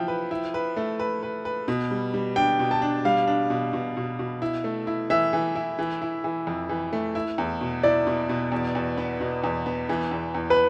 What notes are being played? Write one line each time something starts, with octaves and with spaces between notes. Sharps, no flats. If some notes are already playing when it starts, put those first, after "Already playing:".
Already playing: F3 E4 G5
B4
E4
B4
A3
B4
B4
B4
B2
G3
G3
D4 G5
B2
A5
D4
G3 F5
D4
B2
B2
B2
B2
E4
A3
E4
E3 E5
E3
E4
E3
E4
E3
F2
E3
A3
E4
E2
B2
E4 D5
B2
B2
E2
E2
B3
B2
E2
B3
E3
E2
E2
B4